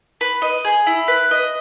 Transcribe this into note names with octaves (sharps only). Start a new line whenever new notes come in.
B4
D#5
G#4
E4
B4
D#5